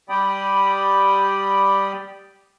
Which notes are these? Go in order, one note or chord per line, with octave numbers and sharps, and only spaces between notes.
G3 G4 D5 G5 B5 D#6